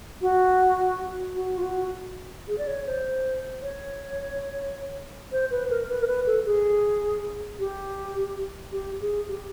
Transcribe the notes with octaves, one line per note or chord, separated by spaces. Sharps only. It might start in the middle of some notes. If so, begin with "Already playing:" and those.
F#4
F#4
F4
F#4
G#4
D5
C#5
C5
C#5
C5
B4
A#4
B4
A#4
B4
A4
G#4
G4
G4
G#4
G4